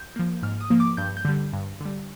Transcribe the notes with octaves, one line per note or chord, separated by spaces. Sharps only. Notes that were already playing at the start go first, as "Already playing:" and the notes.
Already playing: G6
F3 A#3
G#2 F6
D#6
F3 A#3
D6
G2 G6
G6
D3 G3
G2
D3 G3